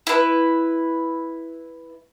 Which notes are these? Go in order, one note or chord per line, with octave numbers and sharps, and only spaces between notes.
E4 B4